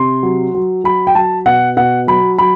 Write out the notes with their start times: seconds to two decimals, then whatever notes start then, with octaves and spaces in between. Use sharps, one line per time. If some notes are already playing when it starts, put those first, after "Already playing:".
Already playing: C3 C6
0.23 F#3
0.54 F#3
0.84 F#3 B5
1.07 G5
1.15 F#3 A5
1.46 B2 F#5
1.77 B2 F#5
2.07 F#3 B5
2.38 F#3 B5